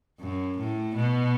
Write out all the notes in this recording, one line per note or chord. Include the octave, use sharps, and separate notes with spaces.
F#2
A2
B2